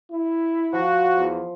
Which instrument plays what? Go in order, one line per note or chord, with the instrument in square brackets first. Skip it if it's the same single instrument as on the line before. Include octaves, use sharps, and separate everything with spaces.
[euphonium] E4
[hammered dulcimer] F3 [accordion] F#4
[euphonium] E2